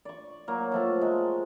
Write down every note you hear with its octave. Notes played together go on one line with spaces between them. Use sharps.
D5 C#6
F#3 A#3
F3 A3 A5
G#3